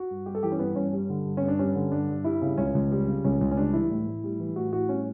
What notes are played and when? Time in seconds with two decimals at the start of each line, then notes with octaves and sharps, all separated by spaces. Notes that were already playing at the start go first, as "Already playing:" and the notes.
Already playing: F#4
0.10 G2
0.26 G3 G4
0.35 A4
0.43 E3 G4
0.52 C#4
0.59 G2 B3
0.75 G2 C#4
0.93 G3
1.10 D3
1.26 G2
1.37 C#4
1.43 G2
1.48 D4
1.59 G3 C#4
1.75 D3
1.92 G2 D4
2.09 G2
2.24 G3 E4
2.42 C#3
2.58 C#2 C#4
2.75 C#2
2.92 G3
3.08 C#3
3.24 C#2 C#4
3.41 C#2
3.51 C#4
3.57 G3 D4
3.73 E3 E4
3.90 A2
4.07 A2
4.24 G3
4.40 E3
4.56 A2 F#4
4.72 A2 F#4
4.89 G3 C#4